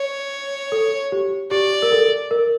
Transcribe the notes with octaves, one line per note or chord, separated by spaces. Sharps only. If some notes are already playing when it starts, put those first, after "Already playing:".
Already playing: C#5
A4
G4
G4 D5
A#4
A4
A#4